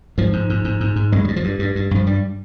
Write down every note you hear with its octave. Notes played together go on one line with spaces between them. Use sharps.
G#2 F3
G#2
G#2
G#2
G#2
G#2
G2 G#3
G3
G2
F3
G2
G2
G2
G2 F3
G2 G3